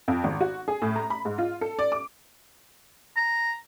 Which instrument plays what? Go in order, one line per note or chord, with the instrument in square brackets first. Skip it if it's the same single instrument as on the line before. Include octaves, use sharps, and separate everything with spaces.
[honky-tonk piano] F2
G#1
F#4
G#4
A2
A#5
B5
G#2
F4
A4
D5
D6
[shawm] A#5